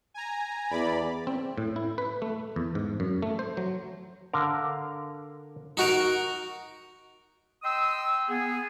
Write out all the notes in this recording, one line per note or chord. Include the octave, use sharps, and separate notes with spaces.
G#5 A#5
E2 D5 B5
C4
A2
E4
B4
A3
E2
G#2
F#2
A3
C5
F#3
D3 A#4 F5
D#4 F#4 A#4
D#5 G5 C6 D#6 E6
B3 G#4